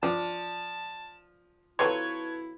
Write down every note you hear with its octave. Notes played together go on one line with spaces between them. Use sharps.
F3 D4 A5
F#3 C4 E4 F4 A4 B4 C#5